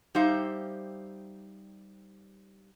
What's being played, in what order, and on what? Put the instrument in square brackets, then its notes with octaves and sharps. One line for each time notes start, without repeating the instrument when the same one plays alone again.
[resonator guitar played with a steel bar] G3 D#4 G4 C5 E5 F5